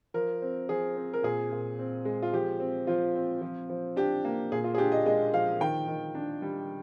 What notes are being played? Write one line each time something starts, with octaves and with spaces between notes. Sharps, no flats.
F3 A#4
C4
F3 G#4
C4
A#4
A#2 G#4
A#2
C4
G#3
F4
F3 G4
C4
F3 F4
C4
F3
F3
D4 G4
A#3
A#2 G#4
F4
G#4
D4 G4
D#5
G#3 D#5
F3 F5
D#3 G5
D#3
D4
G3